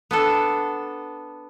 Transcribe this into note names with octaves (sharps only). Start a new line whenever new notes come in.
B3 D4 A4